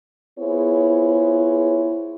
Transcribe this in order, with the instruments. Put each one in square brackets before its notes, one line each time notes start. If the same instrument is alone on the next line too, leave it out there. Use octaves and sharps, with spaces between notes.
[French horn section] B3 E4 F4 G#4 C5 C#5